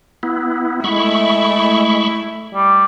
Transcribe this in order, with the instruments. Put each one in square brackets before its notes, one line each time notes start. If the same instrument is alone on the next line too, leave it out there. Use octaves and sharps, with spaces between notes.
[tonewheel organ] B3 E4
[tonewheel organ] G#3 B5 C#6 [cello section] A3 E4
[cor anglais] G3